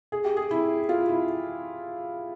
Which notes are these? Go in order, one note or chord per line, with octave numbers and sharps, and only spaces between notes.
G#4
G4
G#4
E4
F4
E4